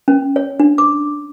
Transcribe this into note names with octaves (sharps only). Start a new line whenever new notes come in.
C#4
C#5
D4
D6